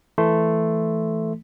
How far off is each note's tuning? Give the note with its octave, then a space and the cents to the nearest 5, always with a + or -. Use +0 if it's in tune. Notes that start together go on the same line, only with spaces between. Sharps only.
E3 +5 A3 +0 C6 -15